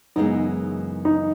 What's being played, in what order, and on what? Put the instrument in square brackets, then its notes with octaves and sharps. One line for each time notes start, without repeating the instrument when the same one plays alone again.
[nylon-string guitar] F#2 C#3 E3 G#3 B3 [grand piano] D#4
[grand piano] D#4